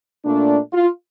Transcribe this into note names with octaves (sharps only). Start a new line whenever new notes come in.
A#2 A3 D4
F4